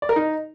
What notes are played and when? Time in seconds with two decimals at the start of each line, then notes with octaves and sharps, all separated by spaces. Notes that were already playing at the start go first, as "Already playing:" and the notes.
0.02 D5
0.09 A#4
0.16 D#4